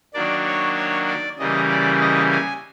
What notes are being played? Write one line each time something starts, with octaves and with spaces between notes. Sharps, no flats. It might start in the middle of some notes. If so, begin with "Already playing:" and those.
D#3 F#3 A#3 D4 D5
C#5
C#5
D5
C#3 E3 G3 A#3 D#5
D5
D#5
G#5